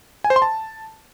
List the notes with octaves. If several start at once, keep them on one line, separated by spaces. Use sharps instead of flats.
G#5
C5
C6
A5